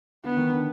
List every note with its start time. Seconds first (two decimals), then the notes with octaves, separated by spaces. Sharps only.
0.24 D3 B3
0.37 D#3
0.49 D3